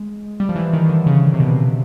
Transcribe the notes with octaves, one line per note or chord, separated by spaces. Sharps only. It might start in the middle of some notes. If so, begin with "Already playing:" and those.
Already playing: G#3
G3
F3
E3
D#3
D3
C#3
C3
B2